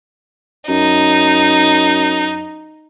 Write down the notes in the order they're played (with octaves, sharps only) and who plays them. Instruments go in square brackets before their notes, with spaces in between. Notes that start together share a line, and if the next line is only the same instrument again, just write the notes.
[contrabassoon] F#2 [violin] D#4